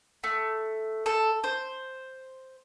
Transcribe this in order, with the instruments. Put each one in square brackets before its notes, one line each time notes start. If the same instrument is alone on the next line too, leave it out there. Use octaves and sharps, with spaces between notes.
[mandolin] A3
A4
C5